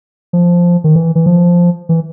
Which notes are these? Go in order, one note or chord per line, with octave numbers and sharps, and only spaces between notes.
F3
D#3
E3
E3
F3
E3